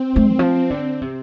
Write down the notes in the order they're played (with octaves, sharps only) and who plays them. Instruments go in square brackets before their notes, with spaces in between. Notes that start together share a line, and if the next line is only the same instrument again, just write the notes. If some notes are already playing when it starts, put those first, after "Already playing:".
Already playing: [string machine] C4
[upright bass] A3
D#3
F3
D3
C3